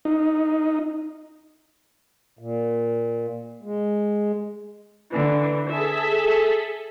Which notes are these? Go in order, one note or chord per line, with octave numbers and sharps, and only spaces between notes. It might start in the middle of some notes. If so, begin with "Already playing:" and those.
D#4
A#2
G#3
D3 E3
G#4 A4 E5 B6